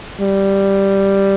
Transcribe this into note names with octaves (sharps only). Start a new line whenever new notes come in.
G3